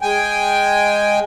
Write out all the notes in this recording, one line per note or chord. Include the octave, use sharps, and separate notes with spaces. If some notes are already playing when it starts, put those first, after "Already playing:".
G#3 G5 G#5